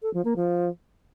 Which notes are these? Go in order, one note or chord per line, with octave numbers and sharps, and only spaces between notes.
A4
F3
A#3
F3